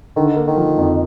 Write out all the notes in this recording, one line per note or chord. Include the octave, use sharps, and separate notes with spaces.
D3 D#3
A#3
D#3
F3
F2